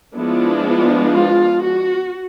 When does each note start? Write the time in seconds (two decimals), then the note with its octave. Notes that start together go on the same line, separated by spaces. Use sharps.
0.15 F3 G#3 B3 D4 E4
1.12 F4
1.62 F#4